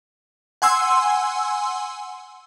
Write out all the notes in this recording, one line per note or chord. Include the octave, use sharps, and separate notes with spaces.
F#5 G#5 C6 E6